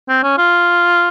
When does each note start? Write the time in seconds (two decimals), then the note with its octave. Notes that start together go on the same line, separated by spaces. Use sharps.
0.09 C4
0.23 C#4
0.38 F4